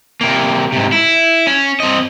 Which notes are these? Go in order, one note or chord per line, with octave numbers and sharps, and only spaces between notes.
C3 A#3
G#2 C3
E4
C#4
C4 D#5